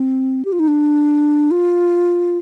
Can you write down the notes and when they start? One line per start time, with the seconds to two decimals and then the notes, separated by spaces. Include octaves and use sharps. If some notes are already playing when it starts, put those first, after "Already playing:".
Already playing: C4
0.45 G4
0.53 F4
0.60 D#4
0.68 D4
1.51 F4